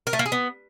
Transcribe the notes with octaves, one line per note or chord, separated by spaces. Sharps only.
A#4
A3
A#3
G#4
B3